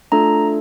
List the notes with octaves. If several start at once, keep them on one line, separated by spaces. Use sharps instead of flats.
A3 D4 F4 A4 A#5